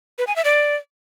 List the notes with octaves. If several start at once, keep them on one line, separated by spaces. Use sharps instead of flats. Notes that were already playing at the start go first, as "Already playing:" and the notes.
B4
G#5
E5
D5